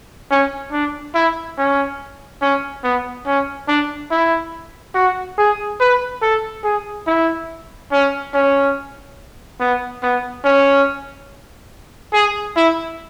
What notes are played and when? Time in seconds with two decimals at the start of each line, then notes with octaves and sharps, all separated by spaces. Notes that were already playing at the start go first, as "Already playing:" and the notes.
0.31 C#4
0.72 D4
1.14 E4
1.58 C#4
2.42 C#4
2.84 B3
3.26 C#4
3.68 D4
4.11 E4
4.95 F#4
5.38 G#4
5.80 B4
6.22 A4
6.64 G#4
7.07 E4
7.92 C#4
8.34 C#4
9.60 B3
10.03 B3
10.44 C#4
12.13 G#4
12.56 E4